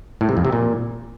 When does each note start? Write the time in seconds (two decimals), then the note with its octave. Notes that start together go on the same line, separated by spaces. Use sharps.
0.21 A2
0.29 C3
0.37 F2
0.45 C3
0.52 A#2